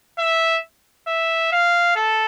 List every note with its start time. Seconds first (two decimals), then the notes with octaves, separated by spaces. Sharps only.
0.19 E5
1.08 E5
1.52 F5
1.96 A4